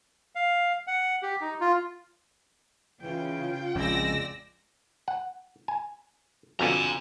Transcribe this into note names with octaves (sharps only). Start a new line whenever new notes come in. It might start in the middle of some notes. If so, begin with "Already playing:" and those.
F5
F#5
G4
D#4
F4
C#3 E3 F4 G5
A#1 F2 C#3 G#3 D5 E6 A#6
F#5
G#5
F2 B2 D3 G#5 A#5